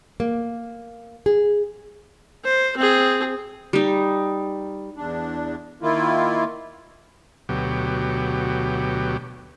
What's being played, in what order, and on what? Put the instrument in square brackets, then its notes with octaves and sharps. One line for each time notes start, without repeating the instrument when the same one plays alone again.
[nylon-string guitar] A#3
G#4
[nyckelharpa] C5
C4 G#4
[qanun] G3 D#4
[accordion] E2 D4
D#3 A#3 E4 F4
[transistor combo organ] D2 B2 F#3 G4